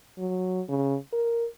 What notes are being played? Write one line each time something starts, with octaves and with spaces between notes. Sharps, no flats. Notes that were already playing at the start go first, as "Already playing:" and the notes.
F#3
C#3
A#4